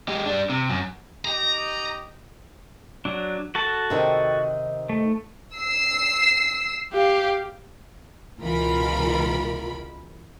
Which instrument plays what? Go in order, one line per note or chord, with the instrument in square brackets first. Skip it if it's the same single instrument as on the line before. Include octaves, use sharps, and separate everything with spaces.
[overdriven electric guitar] G#3 G4
G3 D4
C3
F#2
[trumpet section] D#4 G4 D#5 [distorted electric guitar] A#5
[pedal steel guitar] F#3 D4
F#4 A4 A5
[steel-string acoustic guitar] C3 D#3 D#4
[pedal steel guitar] A3
[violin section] E6 C7
[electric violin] G4 [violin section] F5
[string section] C#2 B2 E3 F4 A#4 B5